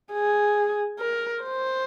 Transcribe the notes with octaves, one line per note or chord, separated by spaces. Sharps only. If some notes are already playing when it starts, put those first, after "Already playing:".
G#4
A#4
C5